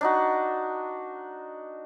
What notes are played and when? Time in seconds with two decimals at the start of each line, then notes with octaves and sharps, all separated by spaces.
0.01 D4 D#4 F#4